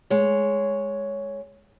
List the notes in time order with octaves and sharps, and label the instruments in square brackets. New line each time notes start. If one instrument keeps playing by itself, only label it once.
[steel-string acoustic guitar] G#3 C#5